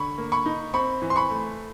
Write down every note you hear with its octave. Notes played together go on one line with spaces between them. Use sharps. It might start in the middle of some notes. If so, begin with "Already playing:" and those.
Already playing: D3 B5 C#6
A#3
B5 C#6
D#4
C4 B5 C#6
E3
C6
B5 C#6
A3